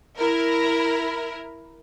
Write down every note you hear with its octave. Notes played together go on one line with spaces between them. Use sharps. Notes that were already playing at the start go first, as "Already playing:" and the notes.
E4 A#4